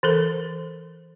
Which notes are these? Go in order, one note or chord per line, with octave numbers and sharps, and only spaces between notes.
E3 A4 A#4